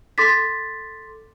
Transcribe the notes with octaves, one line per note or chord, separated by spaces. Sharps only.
A4 C6 D6 A6 B6